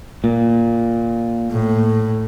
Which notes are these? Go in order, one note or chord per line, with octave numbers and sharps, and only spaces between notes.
A#2
A2